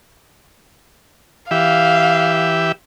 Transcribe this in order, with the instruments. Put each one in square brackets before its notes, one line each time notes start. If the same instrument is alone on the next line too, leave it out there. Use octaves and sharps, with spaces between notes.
[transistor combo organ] E3 G4 E5 [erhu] F5